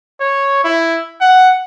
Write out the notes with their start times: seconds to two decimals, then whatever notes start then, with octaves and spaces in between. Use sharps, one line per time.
0.20 C#5
0.64 E4
1.21 F#5